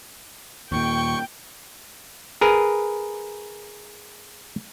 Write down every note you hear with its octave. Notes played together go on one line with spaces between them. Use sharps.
D#2 A#2 G5 C#6
G#4 A#4 B4